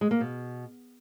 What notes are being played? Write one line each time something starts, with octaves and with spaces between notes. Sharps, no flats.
G#3
A#3
B2